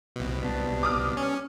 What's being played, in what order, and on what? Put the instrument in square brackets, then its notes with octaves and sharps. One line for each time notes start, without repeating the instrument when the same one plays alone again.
[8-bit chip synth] C2 B2
[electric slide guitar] G3 B3 D4
[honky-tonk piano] D6 D#6 F6
[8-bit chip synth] C#4